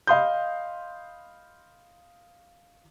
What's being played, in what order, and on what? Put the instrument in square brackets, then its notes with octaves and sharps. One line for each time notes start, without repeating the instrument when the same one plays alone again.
[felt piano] D#5 F5 B5 C6 D#6 G6